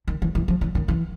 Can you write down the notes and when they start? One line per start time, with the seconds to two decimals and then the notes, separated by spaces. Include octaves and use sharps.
0.08 D#3
0.22 E3
0.35 E3
0.48 F3
0.61 E3
0.75 D#3
0.88 E3